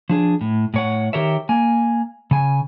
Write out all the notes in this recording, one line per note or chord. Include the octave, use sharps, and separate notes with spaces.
F3 D4 G#4
A2
A2 C#5 F#5
D#3 G4 A#4 C#5 E5
A#3 G#5
C#3 G#5